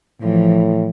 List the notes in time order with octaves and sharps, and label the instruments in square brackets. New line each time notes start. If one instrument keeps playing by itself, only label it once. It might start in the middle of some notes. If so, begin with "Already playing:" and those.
[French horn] A2 [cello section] E3 F3